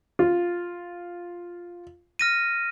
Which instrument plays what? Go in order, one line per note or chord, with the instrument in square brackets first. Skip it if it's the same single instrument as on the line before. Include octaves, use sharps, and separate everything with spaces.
[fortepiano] F4
[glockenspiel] F6 A#6 D#7